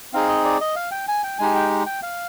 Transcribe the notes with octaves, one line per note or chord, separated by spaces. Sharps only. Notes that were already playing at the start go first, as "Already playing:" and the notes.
C4 D#4 G#4 F5
D#5
D5
D#5
F5
G5
G#5
G5
G#3 D#4 G4 G#5
G5
G5
F5